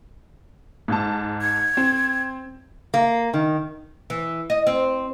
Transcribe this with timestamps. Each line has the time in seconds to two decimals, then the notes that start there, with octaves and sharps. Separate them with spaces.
0.88 G#2 A5
1.41 G#6
1.77 C4
2.94 A#3
3.34 D#3
4.10 E3
4.50 D#5
4.67 C4